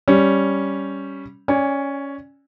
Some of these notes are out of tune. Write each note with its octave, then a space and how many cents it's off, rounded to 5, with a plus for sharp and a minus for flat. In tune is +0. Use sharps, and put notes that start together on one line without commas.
G3 +0 C#4 +0
C#4 +5 D5 +0 G#5 -20